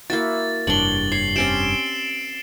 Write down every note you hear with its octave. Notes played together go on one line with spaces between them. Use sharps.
A#3 E4 F#4 A6
F1 G2 D4 C#5 F#7 G7
C#5 C7
C4 C#4 G4 D7 E7